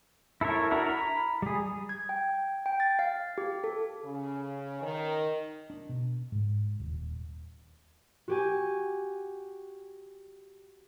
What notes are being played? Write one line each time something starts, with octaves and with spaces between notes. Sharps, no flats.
E4 A4 A#4 C#5
D4 E4 F#4 A#4
A#5 B5
G3 G#4
G#6
G5
G5
A6
F5
G4
A4
C#3
D#3
D4
B2
G#2
D#1
F#4 G4 G#5